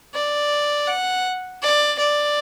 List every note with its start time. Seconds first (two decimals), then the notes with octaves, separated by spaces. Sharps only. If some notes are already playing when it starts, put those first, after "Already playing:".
0.15 D5
0.87 F#5
1.62 D5
1.99 D5